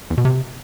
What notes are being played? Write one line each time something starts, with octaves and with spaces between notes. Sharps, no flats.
E2
B2
C3